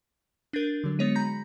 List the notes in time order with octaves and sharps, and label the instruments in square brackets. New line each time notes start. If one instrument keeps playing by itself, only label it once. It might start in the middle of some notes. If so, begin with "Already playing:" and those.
[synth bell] D4 A#4 [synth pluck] G6 A6 D#7
[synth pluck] D3 F#3
[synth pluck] G#3 A#6 C#7 [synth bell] B3 C#5 D#7
[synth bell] A#5 G6 A#6 [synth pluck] B5